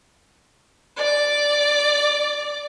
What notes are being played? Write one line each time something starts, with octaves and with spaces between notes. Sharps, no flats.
D5 D6